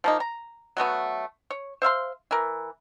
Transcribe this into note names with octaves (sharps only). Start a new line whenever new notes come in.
F3 A#3 D#4
A#5
F#3 A3 B3 F#4
C#5
C5 E5 F5 C6
E3 A#4